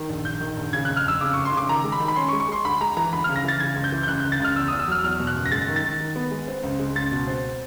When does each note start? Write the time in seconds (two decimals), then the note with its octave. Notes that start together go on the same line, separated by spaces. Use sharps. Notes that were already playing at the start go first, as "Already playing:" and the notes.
Already playing: D#3
0.09 A#1
0.25 A#1 G6
0.41 D#3
0.57 A#1
0.73 C#3 G#6
0.85 F2 F#6
0.97 F6
1.05 F2 E6
1.21 C#3 D6
1.33 F1 C#6
1.45 C6
1.52 C#3
1.57 D6
1.69 D#3 A#5
1.84 G#3
1.92 B5
2.00 D#3
2.08 B5
2.16 C#4 C6
2.28 C#6
2.32 G#3
2.40 C#6
2.48 G#3 C6
2.65 D2 B5
2.81 G#3 A#5
2.97 E3 A#5
3.13 D2 B5
3.24 C#3 F6
3.36 A#6
3.44 E3 A6
3.60 C#3 G#6
3.76 C#2
3.84 G6
3.92 E3
4.03 G6
4.08 C#2 F#6
4.20 C#2 G6
4.32 A6
4.40 C#2 F6
4.56 E2 E6
4.68 E2 D#6
4.79 E6
4.88 F#3 F6
5.04 E2 F6
5.20 B2
5.27 F#6
5.35 F#1
5.46 A#6
5.51 G#3 A6
5.68 D#3
5.76 A6
5.84 D#3
6.00 D#3
6.16 B3
6.31 G#3
6.48 C4
6.63 C#2
6.79 G#3
6.95 C#2 A6
7.12 B2
7.27 C4